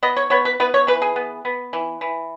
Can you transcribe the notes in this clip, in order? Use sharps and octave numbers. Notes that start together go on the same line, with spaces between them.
B3 D#5
C#5
B3 C#5
B4
B3 B4
C#5
E3 B4
G#4
B3
B3
E3
E3